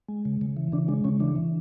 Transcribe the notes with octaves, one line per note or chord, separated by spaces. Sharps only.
G#3
C#3
C#3
E3
C#3 D4
G#3 D4
C#3 C#4
E3 D4
E3